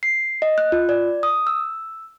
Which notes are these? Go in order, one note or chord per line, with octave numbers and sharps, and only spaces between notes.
C7
D#5
F#6
F4
D5
D#6
E6